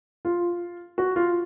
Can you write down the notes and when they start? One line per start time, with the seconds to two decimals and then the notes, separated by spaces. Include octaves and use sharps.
0.25 F4
0.98 F#4
1.16 F4